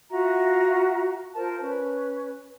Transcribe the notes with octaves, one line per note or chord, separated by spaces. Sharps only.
F4 F#4 E5 A#5
F4 A#4 C5 A5
C#4 B4